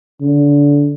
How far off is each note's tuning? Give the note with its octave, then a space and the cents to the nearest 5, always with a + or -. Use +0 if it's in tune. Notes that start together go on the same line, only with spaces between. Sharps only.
D3 -25